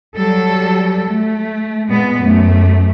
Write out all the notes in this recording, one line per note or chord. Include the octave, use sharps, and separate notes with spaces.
F#3 G3 A4
A3
A#2 G#3 B3
F#2 A3